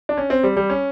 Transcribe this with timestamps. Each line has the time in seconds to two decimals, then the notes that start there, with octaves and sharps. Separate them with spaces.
0.09 D4
0.17 C#4
0.30 C4
0.43 G3
0.57 G3
0.70 C#4